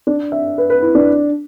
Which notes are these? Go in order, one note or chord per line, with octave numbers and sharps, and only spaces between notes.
D4
E5
B4
B4
E4
D4